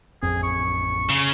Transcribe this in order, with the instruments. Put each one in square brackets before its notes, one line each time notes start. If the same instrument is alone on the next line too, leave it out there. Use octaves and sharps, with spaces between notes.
[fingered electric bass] A1 F2 C4 [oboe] G#4
[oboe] C#6
[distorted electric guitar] C#3